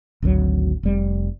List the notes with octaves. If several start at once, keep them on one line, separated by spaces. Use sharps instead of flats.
G#1 D2 D#3 F#3
F1 G3